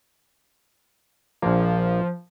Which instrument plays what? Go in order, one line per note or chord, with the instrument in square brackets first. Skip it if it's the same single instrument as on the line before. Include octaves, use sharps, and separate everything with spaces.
[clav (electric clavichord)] A#1 A#3 [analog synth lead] F3